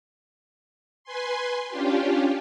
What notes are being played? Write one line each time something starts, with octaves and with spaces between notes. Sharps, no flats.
B4 G#5 C6
C#4 D4 F4 G4